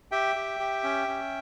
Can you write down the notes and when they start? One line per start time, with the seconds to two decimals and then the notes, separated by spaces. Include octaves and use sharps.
0.11 G4 E5 G5
0.36 G4
0.60 G4
0.84 C#4
1.08 C#4